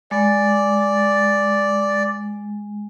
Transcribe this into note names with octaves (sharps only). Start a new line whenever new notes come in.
G#3 D5